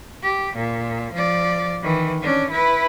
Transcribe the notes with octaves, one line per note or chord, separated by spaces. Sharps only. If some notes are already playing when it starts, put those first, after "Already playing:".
G4
A#2
F3 D5
D#3 E3
C#4 D4
E4 B4